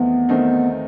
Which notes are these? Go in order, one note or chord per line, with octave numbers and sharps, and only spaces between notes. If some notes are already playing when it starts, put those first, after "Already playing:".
Already playing: E2 D#3 A3 B3 C4
D#3 A3 C4 D#4